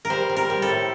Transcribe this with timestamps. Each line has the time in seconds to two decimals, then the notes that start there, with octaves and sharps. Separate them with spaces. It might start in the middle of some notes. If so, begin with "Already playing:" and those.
0.05 A#4
0.10 G3 C5
0.29 G3
0.36 A#4
0.50 G3
0.62 A4
0.69 A2